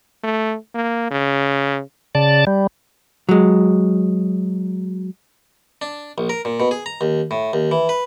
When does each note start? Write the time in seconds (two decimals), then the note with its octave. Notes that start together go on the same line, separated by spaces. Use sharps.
0.24 A3
0.75 A#3
1.11 C#3
2.15 C#3 D5 A5
2.47 G3
3.29 F#3 G#3
5.82 D4
6.18 A#1
6.30 A#4
6.45 A#2
6.60 B2
6.71 G#4
6.86 A#5
7.01 D#2
7.31 A2
7.53 D#2
7.71 E3
7.89 B4